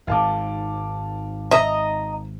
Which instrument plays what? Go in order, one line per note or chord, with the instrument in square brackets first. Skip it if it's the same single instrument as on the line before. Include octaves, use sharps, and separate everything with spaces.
[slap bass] G#1 G#2 [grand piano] F5 A5 D6
[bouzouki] D#5 A#5 [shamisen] E5